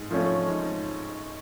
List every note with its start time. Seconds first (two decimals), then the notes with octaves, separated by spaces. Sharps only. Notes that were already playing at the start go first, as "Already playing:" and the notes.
Already playing: G#2
0.11 F3 A3 C#4
0.47 G#2